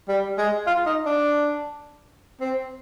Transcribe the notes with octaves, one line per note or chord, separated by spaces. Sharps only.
G3
G#3
F4
D#4
D4
C4